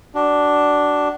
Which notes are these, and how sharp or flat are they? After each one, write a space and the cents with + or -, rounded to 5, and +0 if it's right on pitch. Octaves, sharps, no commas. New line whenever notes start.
D4 +0 F#4 +30